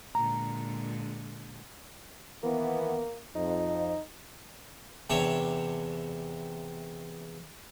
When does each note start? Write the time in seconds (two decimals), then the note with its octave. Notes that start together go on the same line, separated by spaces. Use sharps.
0.15 A#2 D3 G#3 A#5
2.43 D#3 E3 A#3 B3
3.35 F2 D#4
5.10 E2 C3 D4 C#5